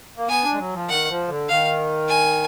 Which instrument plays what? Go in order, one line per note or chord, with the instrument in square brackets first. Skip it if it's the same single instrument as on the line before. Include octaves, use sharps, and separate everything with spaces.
[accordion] A#3
[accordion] B3 [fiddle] G#5
[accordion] D4
G#3
F#3
F3
[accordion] D#3 [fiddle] F#5
[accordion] F3
D3
[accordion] D#3 [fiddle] F5
[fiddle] G#5